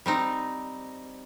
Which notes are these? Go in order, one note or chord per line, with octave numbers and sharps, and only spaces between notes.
G3 C4 D#4